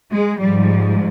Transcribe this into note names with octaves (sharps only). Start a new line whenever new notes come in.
G#3
G#2 F3 G3